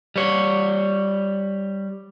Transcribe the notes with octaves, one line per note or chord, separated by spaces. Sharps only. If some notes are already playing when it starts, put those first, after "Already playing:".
G3 C#5